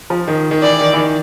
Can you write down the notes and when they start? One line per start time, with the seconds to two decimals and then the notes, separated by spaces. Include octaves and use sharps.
0.10 F3
0.28 D#3
0.51 D#3
0.62 E3 D5
0.80 D#3
0.93 E3
0.97 D#3